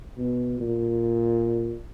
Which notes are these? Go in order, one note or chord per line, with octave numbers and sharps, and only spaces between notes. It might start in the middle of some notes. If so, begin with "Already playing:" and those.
B2
A#2